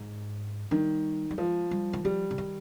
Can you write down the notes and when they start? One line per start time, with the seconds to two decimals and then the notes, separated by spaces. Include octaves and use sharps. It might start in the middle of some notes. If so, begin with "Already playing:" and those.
Already playing: G#2
0.71 D#3 G3
1.31 G3
1.38 F3 G#3
1.71 G3
1.93 D#3
2.04 F3 G3
2.31 D3
2.38 D#3